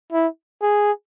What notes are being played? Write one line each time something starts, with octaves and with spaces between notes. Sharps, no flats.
E4
G#4